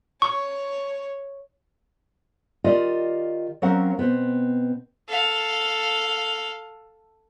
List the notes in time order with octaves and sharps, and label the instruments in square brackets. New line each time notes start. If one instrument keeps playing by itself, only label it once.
[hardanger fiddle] C#5 [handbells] C#6
[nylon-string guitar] D#3 F4 G4 D5 D#5
F#3 C4 C#4 A#4 F5 F#5
B2 B3 C4
[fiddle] A4 F5